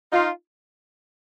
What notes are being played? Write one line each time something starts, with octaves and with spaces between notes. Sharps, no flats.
D#4 F4